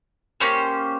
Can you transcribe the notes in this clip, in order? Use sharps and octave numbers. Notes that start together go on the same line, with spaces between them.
A#3 C#4 G4 C5